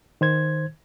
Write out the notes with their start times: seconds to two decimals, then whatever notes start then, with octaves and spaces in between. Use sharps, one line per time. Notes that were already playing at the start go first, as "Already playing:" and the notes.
0.21 D#3 C5 G#6